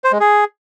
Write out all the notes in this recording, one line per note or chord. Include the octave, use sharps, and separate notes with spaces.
C5
G#3
G#4